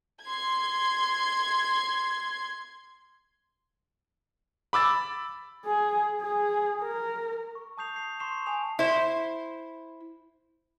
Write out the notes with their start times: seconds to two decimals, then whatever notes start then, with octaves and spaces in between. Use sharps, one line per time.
0.23 C6 G#6
4.73 B5 D6 E6 A6
5.66 G#4
6.21 G#4
6.82 A#4
7.55 C#6
7.78 A5 C#6 D#6 G6 C7 F7
7.96 C7
8.20 C6 C#6 C7 E7
8.46 G#5 A5 D#6 F7
8.79 E4 C5